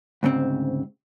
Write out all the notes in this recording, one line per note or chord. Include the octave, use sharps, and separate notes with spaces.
D2 G#2 C#3 C4